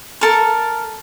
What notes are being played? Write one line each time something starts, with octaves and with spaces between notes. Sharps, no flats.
A4 A#4